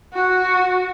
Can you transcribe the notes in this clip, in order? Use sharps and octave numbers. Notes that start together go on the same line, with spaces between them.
F#4